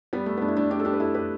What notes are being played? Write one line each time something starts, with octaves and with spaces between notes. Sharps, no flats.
G3 B3
A3
B3
A3 D4
E4
A3 D4
D4 G4
A4
D4 G4
B4
E4 A4
G4 B4